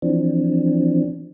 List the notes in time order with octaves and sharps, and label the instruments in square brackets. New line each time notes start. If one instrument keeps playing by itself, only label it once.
[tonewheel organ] E3 F3 C4 D4